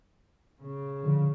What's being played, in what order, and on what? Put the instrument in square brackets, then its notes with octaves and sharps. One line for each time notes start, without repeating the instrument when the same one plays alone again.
[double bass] C#3
[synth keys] D3 F3